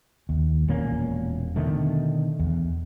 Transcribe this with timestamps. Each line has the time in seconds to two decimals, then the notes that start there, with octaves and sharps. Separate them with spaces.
0.29 D#2
0.68 E1 A#2 A#3 C#4
1.56 B2 D3 D#3 A3
2.39 E2